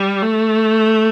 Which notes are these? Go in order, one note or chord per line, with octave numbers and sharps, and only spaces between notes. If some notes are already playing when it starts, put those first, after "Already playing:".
Already playing: G3
A3